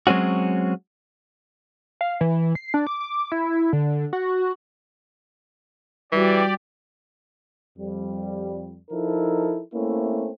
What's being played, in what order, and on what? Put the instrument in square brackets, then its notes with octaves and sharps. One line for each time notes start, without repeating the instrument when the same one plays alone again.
[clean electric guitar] F#3 G#3 C4 C#4 F#4
[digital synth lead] F5
E3
C7
D4
D6
D6
E4
D3
F#4
[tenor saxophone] E3 [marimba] G3 F#4 [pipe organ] G4 D5
[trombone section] F2 G3
F3 D#4 E4 A4 A#4
A3 A#3 C4 C#4 E4